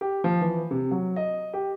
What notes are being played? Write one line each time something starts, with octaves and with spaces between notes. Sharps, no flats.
G4
F3
E3
C3
F#3
D#5
G4